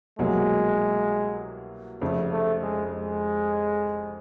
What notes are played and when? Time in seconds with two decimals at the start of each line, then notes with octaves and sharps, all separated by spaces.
0.19 C2 B2 F#3 G#3 A#3
2.01 F1 F2 C#3 A3
2.32 A3
2.62 G#3
2.92 G#3